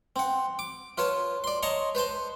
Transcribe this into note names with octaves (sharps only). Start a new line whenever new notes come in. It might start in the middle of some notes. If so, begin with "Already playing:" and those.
C4 F#5
D6
F4 B4 C#5 A5
D5 C6
C#5 D#5 A5 A#5 C6 C#6
B4 C5 A5 C6